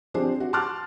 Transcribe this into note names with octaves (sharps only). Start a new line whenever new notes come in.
F3 C4 D4 G4 G#4 C5
F#4
A5 C6 D6 F6 F#6 A6